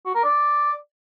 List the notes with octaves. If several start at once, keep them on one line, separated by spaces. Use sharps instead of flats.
F#4
A#4
D5